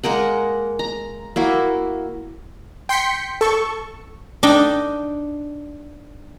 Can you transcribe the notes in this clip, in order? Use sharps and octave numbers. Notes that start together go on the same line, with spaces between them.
G#3 A#3 A#4 F#5
A#5
A#3 E4 F#4
G5 C6 G6 B6 C#7
A4 C#6
D4 D#4 G5